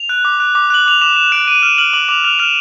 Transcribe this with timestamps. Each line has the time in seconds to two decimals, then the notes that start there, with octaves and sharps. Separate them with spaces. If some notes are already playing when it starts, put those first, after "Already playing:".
Already playing: F7
0.09 F#6
0.25 D6
0.40 F#6
0.55 D6
0.70 F#6 F#7
0.86 D6 F7
1.01 D6 E7
1.16 D6 E7
1.32 F#6 D7
1.47 D6 D#7
1.63 F6 E7
1.78 F6 F#7
1.93 D6 F#7
2.09 D6 F7
2.24 F6 F7
2.39 F6 E7